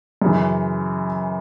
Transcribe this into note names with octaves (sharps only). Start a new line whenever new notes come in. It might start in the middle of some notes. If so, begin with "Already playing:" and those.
F#2 C#3 E3